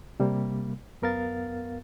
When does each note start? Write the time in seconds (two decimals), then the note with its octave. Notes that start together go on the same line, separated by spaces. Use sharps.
0.20 C3 G3 A#3
1.02 F#2 B3 A#4 F5 A6